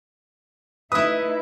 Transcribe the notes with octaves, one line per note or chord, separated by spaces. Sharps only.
A3 D#4 E4 B4 E5 D#6